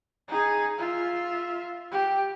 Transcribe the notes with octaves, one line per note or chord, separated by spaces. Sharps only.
D#4 G#4
F4 E5
G4